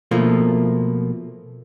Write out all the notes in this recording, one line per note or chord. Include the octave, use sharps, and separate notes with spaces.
B2 F3 A3 A#3